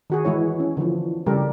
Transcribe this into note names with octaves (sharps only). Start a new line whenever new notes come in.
D#3 F#4 G#4
E3 G#3 E4 C#5
C#4
D3 E3 F3
C#3 G3 G4 A4 A#4